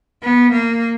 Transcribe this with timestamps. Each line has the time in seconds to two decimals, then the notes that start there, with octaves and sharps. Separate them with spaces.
0.23 B3
0.52 A#3